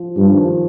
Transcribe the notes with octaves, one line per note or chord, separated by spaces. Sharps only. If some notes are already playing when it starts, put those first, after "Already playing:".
Already playing: F3
G2 G3
F3
D#3
F3